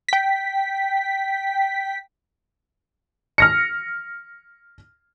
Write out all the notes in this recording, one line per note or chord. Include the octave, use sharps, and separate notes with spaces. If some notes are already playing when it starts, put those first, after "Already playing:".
G5 B6
F6 A#6 C#7